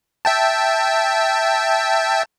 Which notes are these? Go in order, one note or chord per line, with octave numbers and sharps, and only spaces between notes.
E5 G5 A5